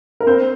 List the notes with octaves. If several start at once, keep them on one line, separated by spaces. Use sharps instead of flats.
A#4
C4 C5